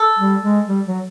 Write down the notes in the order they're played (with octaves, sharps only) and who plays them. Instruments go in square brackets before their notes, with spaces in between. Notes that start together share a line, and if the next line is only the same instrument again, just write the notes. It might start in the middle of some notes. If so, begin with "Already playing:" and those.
Already playing: [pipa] A4
[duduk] G3
G#3
G3
F#3